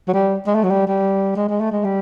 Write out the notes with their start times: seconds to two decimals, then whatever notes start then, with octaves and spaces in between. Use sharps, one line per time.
0.08 F#3
0.14 G3
0.47 G#3
0.55 A3
0.64 F#3
0.71 G3
0.87 G3
1.36 G#3
1.49 G#3
1.60 A3
1.72 G#3
1.84 G3